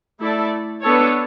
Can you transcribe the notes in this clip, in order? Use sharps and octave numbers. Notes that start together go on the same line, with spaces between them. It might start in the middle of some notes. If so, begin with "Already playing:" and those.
A3 E4 A4 D5
B3 D4 A4 C#5